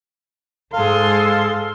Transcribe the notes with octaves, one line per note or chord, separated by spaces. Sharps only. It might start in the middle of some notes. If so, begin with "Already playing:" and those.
G#2 G#3 A4 F5 C6